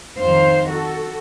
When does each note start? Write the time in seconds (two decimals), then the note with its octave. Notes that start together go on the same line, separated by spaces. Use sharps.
0.19 F2 D#3 C5 F5
0.69 F#4 A4